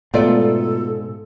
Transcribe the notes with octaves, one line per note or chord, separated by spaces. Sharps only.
G#2 B2 A3 F4 A4 D5 F#5